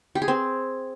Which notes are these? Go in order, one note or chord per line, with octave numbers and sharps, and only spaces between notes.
G4
G#4
C4